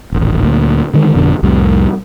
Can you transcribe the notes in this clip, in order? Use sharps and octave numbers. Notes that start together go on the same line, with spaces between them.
D#1 A1
D2 A#2
D3 D#3 G#3
G#1 F2 B2 D3
C2 F2 A2 G3